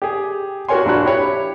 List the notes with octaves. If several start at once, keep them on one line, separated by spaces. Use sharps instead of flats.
G4 G#4
F#4 G4 A#4 C#5 G#5 C6
A#1 D4 F#4 F#6
E4 G4 C#5 B5